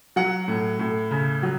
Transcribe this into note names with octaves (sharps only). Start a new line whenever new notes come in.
F#3 F#5
A2
A2
C#3
F#3